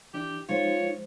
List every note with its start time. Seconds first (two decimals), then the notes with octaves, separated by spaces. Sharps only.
0.14 E3 D4 E4 G4
0.49 F3 G#3 D#4 F4 C5 C#5